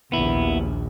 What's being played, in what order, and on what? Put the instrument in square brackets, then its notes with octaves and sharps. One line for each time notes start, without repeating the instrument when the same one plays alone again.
[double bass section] A#1 D#2 [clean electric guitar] B3 E4